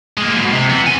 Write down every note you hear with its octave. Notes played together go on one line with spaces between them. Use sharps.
G#3 A#3
G#2 B2
C3
E3 B3
C4 G#5